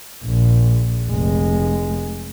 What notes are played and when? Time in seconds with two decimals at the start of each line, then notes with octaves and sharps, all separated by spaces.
0.25 A#1
1.10 F1 G#3